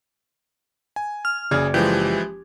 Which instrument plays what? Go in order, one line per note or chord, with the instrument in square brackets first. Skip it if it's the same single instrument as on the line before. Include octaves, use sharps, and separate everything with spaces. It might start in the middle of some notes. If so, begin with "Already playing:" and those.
[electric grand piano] G#5
[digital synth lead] F6
[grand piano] F#1 D5 G#6 [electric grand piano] C#3 G#4
[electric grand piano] E3 F3 G#3 [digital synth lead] G4